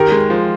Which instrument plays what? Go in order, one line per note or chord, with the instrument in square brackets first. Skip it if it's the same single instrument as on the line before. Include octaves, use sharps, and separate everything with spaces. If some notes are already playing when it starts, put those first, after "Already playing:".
Already playing: [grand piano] D#3 A#4 [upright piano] G4
[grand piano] G#3
F3